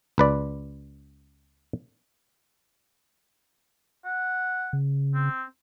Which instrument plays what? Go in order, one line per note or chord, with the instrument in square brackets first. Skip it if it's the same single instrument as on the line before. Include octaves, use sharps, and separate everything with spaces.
[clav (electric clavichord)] C#2 B4 D5
[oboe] F#5
[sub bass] C#3
[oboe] C4